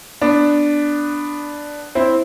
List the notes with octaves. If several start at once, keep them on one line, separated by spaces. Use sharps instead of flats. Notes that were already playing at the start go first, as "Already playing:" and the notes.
B3 D4
C4 E4